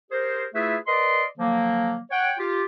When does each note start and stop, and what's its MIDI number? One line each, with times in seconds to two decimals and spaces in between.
0.11 0.46 67
0.11 0.46 68
0.11 0.46 70
0.11 0.46 72
0.54 0.76 57
0.54 0.76 64
0.54 0.76 65
0.54 0.76 68
0.54 0.76 71
0.54 0.76 76
0.87 1.24 70
0.87 1.24 71
0.87 1.24 74
0.87 1.24 75
0.87 1.24 84
1.38 1.97 50
1.38 1.97 53
1.38 1.97 54
1.38 1.97 58
2.11 2.33 73
2.11 2.33 78
2.11 2.33 79
2.38 2.63 65
2.38 2.63 67